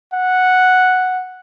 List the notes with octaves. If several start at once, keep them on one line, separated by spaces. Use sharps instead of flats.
F#5